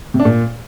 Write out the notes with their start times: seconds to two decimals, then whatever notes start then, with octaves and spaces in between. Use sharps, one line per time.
0.14 C3
0.20 D4
0.25 A#2